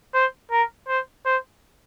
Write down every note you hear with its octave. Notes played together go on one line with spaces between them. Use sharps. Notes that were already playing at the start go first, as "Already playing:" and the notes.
C5
A#4
C5
C5